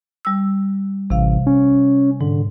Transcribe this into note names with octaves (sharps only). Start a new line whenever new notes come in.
G3 E6
A1 C3 F5
C#4
G#2 D3